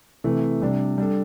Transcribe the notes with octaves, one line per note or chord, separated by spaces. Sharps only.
C3 E3 A3
C3 G3 D4
G3 D4 A4